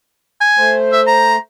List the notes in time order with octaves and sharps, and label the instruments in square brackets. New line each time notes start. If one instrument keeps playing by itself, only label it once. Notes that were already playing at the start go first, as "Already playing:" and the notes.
[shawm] G#5
[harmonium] A3 C5
[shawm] E5
A#5